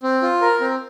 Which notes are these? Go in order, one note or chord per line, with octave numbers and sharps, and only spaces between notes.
C4
F4
A#4
C4